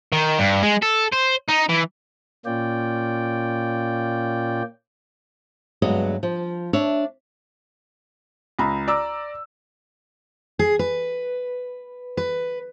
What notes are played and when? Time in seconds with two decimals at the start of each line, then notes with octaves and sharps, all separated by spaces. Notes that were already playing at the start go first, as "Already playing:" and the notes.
0.12 D#3
0.39 G2
0.63 G#3
0.82 A4
1.12 C5
1.48 D#4
1.69 E3
2.46 A#2 A#3 C#4 F4 D5 G5
5.82 D2 G2 F#3 G#3 B3 D#5
6.23 F3
6.73 D4 C#5 E5
8.59 C#2 A#5 B5
8.88 D5 A#5 D6 E6
10.59 G#4
10.79 B4
12.17 B4